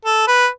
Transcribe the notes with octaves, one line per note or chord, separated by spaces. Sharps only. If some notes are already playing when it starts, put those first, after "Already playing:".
A4
B4